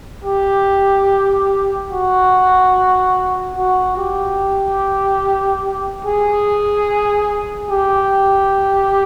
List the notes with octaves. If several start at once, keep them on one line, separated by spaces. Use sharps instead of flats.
G4
F#4
F#4
G4
G#4
G4